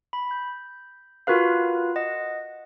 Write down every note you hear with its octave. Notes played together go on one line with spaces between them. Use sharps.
B5
G6
F4 F#4 A#4 B4 F5
D#5 F#5